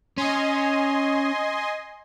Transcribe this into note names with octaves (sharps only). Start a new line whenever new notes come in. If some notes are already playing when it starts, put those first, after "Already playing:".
C#4 D#5 G#5 C6